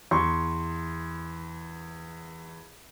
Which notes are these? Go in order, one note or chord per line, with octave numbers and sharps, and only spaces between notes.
E2 C6 C#6